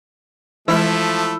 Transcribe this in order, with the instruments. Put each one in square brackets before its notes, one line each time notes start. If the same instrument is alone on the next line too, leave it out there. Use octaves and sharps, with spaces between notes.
[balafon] E3 G#3 [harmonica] F3 A3 [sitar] E4